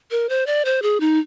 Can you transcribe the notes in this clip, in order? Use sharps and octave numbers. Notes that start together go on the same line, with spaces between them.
A#4
C5
D5
C5
G#4
D#4